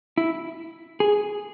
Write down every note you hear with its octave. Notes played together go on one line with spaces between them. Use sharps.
E4
G#4